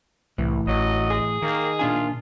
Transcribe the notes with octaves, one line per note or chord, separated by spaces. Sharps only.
C2 A2 E3
A1 F#3 D#5
G#4
D#3 A#3
A#2 D4 F4 G#5